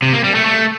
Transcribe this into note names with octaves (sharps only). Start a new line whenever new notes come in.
C3
A#3
G3
A3
A3